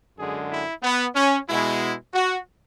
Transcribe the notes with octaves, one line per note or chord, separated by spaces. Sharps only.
F#2 D3 G#3 G#4
E4
B3
C#4
B2 G#3 E4
F#4